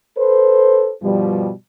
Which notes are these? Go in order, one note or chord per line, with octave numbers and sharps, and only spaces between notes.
A4 B4 C5
G2 B2 F3 G3